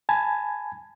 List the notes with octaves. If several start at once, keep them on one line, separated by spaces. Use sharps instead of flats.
G#5 A5 B5 G#6